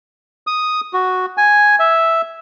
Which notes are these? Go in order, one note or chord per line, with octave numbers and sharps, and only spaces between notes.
D#6
F#4
G#5
E5